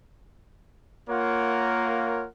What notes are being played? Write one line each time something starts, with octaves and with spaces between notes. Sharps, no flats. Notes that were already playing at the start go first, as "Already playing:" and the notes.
A#3 F4 A#4 C#5 F#5